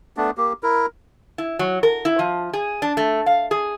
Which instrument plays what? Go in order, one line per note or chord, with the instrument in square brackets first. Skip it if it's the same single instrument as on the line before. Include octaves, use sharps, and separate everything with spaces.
[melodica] A3 B3 D4
A#3 G4
E4 A#4
[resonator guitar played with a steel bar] E4
F#3
A#4
E4
F3
G#4
D4
A3
F5
G#4